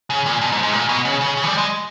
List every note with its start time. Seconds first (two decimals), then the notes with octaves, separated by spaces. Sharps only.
0.10 C#3
0.26 A#2
0.41 B2
0.52 G#2
0.63 G#2
0.73 A#2
0.89 B2
1.05 C#3
1.21 C#3
1.37 C#3
1.44 E3
1.47 G3
1.58 G#3